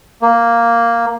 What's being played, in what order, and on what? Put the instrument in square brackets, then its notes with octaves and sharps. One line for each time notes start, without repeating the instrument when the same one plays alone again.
[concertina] A#3